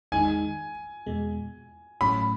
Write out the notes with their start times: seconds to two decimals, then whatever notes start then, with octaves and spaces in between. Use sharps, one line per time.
0.12 E2 D#3 G#3 D#4 G#5
1.06 E2 B2 G#3
2.01 A2 F#3 A3 C#4 B5